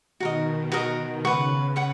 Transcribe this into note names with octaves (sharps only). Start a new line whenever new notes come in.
B2 D#3 F#4 A#4 D#5
F#4 A#4 D#5
C#3 B4 F#5 C#6
B4 F#5 C#6